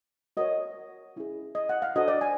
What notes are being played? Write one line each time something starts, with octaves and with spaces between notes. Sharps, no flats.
F#4 A#4 C#5 D#5
C#4 E4 G#4
D#5
F#5
F5
D4 F#4 A4 C5 D#5
D5
G#5